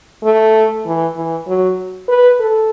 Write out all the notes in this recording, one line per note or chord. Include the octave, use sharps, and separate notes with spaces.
A3
E3
E3
F#3
B4
A4